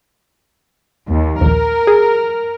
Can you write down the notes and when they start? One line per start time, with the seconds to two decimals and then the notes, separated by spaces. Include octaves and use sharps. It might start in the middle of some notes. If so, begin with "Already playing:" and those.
1.09 D#2
1.41 A#1 D#2 A#4
1.87 G#4